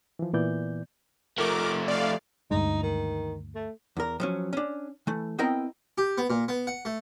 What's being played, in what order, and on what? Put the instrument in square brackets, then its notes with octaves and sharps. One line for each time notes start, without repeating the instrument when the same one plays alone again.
[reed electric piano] E3 F3
A#2 E3 B3 D5 G6
[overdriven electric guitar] F3 A3 [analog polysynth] A#4 D6
[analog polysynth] D5 F5
[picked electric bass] D2 G2 G#3 [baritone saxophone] D#4
[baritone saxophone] D#3
A3
[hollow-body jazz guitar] E2 A#4
F3 F#3 C#4
C#4 D4
E3 A3
B3 C4 E4 A#4 D#5 G5
[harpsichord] G4
B3
A#2
B3
F#5
A3